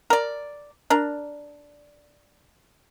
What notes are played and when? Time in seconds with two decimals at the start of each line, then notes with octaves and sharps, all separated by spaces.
0.10 A#4 D5
0.90 D4 A#4